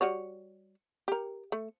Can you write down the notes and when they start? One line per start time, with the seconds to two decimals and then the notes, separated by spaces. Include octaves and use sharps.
0.01 G3 F#4 C#5
1.08 G4 A#4
1.52 A3